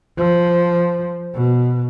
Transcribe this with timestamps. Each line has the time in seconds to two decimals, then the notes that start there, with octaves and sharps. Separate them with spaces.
0.18 F3
1.35 B2